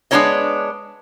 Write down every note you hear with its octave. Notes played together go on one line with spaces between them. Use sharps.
G#3 B3 D4 E4 C#5 D#5